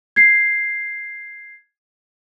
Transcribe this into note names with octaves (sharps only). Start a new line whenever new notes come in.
G#6 C7